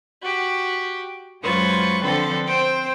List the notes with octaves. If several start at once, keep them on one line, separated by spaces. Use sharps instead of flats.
F#4 G4
F#2 G#3 F4 B4 C5 C#6
D3 F3 C4 A4 B4 C5
C4 C5 G5